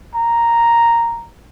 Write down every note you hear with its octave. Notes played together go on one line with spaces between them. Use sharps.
A#5